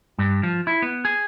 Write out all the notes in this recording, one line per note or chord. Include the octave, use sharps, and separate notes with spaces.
G2
F3
E4
B3
G#4